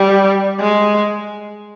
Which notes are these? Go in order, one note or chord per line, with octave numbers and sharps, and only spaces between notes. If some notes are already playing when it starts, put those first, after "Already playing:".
Already playing: G3
G#3